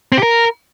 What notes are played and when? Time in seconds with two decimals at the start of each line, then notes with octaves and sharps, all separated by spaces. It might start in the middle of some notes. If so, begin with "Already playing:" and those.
0.12 C4
0.18 G4
0.23 A#4